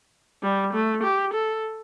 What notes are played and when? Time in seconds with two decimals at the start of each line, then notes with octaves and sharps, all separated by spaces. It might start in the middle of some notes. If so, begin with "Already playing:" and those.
0.43 G3
0.73 A3
1.03 G4
1.34 A4